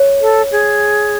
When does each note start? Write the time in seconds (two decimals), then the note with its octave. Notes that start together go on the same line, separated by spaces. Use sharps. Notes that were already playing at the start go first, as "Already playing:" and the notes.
Already playing: C#5
0.21 A4
0.51 G#4